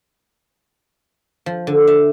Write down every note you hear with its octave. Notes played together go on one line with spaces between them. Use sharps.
F3
D3
E5